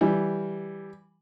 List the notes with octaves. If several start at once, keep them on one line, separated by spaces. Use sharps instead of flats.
E3 G3